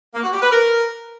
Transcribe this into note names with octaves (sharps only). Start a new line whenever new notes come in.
A#3
F#4
G4
B4
A#4